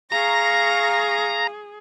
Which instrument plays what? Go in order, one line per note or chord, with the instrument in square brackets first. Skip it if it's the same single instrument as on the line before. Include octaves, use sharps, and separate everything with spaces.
[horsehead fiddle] G#4 [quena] F5 [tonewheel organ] A#5 [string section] C#6 A#6